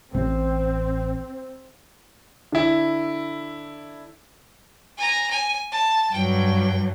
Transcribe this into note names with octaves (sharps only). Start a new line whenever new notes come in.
A1 A2 A3 C4
D3 E4
G#5 A#5
G#5
A5
G2 F#3 G5